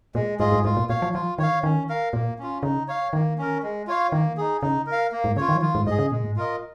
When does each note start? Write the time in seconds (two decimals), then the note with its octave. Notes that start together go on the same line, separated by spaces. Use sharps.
0.15 A#2 G#3
0.39 G#2 F4 G#4 D#5
0.52 G#2
0.65 G#2 F4
0.77 A#2
0.89 A#2 C#5 F5
1.02 F3
1.14 F3 F4
1.38 D#3 C#5 F5
1.63 D#3 C#4
1.89 A#4 F5
2.13 A#2 A#3
2.39 C#4 F4
2.63 C#3 D#4
2.88 C#5 F5
3.13 D#3 A#3
3.38 C#4 A#4
3.63 G#3
3.87 F4 C#5 F5
4.12 D#3 A#3
4.37 D#4 G#4
4.62 C#3 D#4
4.87 A#4
4.92 F5
5.12 A#3
5.24 G#2
5.37 C#3 F4 C#5
5.49 D#3
5.55 F3
5.62 D#3 F4
5.75 G#2
5.87 G#2 D#5
5.90 G#4
5.99 C#3
6.11 A#2 G#3
6.24 G#2
6.35 A#2 F4 A#4 D#5